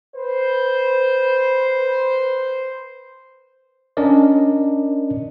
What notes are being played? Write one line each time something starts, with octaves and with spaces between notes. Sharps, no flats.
B4 C5
C#4 D4 A#4 D5 D#5